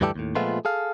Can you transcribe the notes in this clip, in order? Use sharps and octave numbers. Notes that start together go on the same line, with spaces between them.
D2 G2 E3 G3 G4 A4
D#2 A2
A#2 F3 G#3 A3 B3 F4
G#4 A4 F5